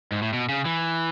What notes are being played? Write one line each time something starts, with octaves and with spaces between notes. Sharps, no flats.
G#2
A2
B2
C#3
E3